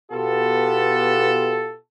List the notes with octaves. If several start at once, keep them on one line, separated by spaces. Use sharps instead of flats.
B2 B3 F4 G4 A4